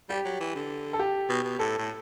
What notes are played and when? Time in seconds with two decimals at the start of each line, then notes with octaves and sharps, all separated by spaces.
0.09 G3 G4
0.25 F#3
0.40 E3
0.55 D3
0.93 A4
0.99 G4
1.29 B2
1.44 B2
1.59 A2 A4
1.78 A2